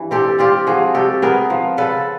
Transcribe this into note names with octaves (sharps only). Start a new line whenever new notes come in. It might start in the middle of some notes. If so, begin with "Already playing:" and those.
Already playing: G2 E3
C4 G4 A4
C4 F4 G4
F3 F#4 G#4
C3 G4 A4
B3 G#4 A#4
F3
C#3 A4 B4